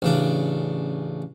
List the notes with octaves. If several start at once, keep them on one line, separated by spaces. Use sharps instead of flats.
A1 C#3 D4